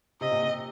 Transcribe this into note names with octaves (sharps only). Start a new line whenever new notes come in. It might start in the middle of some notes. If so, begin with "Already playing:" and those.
C3 D#5
A#2
C3